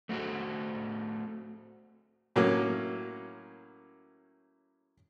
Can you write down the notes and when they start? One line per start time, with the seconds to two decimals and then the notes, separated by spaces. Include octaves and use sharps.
0.09 A3 C4 D#4 F#4 A4
2.36 A2 F#3 A#3 C#4